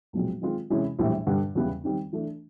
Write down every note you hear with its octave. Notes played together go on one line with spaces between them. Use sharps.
B1 A#2 F3 G#3 C4
D#3 G#3 C4 F4
C3 E3 G#3 C#4 E4
A#1 A2 E3 G3
G2 D3 G3
E2 C#3 E3 G3 B3
D#3 G3 C4 D#4
E3 A3 D4